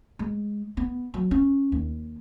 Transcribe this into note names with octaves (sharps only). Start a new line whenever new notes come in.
G#3
B3
F#3
C#4
D#2